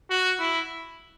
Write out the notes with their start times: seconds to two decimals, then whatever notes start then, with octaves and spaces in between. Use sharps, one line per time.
0.10 F#4
0.40 E4